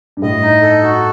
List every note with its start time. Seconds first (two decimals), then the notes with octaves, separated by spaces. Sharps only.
0.17 G2
0.22 A2 D#5
0.42 D#4
0.62 A4
0.83 F#4